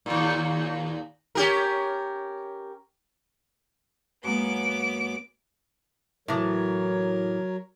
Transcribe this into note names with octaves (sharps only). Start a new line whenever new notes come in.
D#2 A#2
C#4 G4 A#4
F#2 G#3 A#3 B3 D6
A2 E3 F#3 A#4 C#5